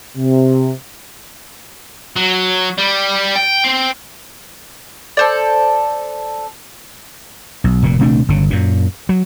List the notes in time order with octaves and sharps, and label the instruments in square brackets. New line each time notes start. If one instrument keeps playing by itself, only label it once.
[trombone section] C3
[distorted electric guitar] F#3
G3
G5
C4
[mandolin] A4 C5 D5
[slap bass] B1
F1 A#2
D#1 C3 A3 D4
G1 C#3
F#2 A#2
F#3